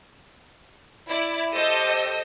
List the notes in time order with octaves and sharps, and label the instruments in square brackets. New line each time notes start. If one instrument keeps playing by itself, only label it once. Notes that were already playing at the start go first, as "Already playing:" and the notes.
[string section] E4 D5
G4 A4 C5 D#5 E6